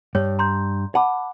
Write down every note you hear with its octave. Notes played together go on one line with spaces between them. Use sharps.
G2 C#5
A#5 C6 G6
F#5 A5 B5 D6